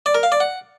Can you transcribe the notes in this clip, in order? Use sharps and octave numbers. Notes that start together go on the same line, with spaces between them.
D5
A#4
F5
D5
F#5